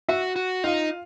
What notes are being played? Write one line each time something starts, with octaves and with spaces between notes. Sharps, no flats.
F#4 E5
F#4
D#4 F4 F5